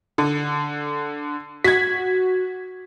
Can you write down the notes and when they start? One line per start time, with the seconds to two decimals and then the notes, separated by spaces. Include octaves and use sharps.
0.18 D3
1.64 F#4 G#6 B6